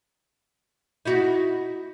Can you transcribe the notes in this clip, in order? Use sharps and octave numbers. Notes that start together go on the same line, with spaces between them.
D#4 E4 F#4